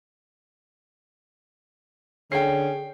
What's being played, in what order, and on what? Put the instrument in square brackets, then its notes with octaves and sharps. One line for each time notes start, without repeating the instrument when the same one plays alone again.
[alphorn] D3 [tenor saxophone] C#4 [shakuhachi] G#4 [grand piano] G5 C7